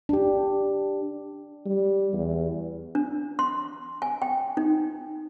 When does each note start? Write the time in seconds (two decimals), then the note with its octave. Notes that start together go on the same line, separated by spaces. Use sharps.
0.09 D4 G4
1.66 G3
2.13 E2
2.95 D4
3.39 C6
4.02 G#5
4.22 G5
4.57 D#4